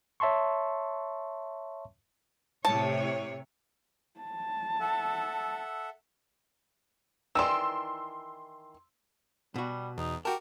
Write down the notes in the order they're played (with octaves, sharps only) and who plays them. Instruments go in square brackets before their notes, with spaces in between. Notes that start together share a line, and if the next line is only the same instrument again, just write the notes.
[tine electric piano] C#5 E5 A5 C6 C#6
[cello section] A2 C3 C#5 [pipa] A5
[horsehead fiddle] A5
[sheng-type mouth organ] A4 E5 F#5
[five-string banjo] D#3 E3 D5 [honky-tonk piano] C6 E6
[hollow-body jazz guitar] B2 F#4 [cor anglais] G3
[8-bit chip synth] E2 [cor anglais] D#4
[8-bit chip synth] F#4 A#4 [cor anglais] G4 [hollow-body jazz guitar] G5 A5